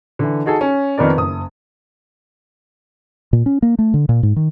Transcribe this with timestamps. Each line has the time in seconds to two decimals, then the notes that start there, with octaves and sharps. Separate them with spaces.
0.19 D3 E3
0.46 D#4 F#4 G#4 A4
0.61 C#4
0.98 F2 D#3 B3 A#4 D5
1.17 F#1 D#6
3.33 A#2
3.46 C#4
3.62 A#3
3.79 A3
3.94 D3
4.09 A#2
4.23 G#2
4.36 D#3